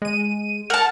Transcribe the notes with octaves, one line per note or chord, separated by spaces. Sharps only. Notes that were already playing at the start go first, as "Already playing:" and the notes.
G#3 D#7
A#4 F#5 A5